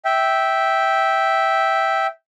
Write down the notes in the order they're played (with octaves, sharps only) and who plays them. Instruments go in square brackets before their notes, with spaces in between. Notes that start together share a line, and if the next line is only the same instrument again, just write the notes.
[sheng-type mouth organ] E5 G5